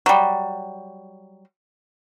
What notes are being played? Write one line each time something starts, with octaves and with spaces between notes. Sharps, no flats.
F#3 G3